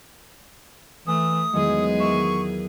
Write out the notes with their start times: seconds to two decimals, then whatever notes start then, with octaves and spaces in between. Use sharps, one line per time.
1.07 E3 A3 D#6
1.53 E2 D#3 F#3 G#3 B3 G#4
2.00 A#4 E5 C#6